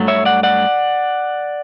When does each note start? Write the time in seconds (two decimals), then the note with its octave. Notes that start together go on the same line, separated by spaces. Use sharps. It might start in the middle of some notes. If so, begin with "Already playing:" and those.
Already playing: G2 F#3 A3
0.08 C#5 E5
0.25 D5 F#5
0.43 D5 F#5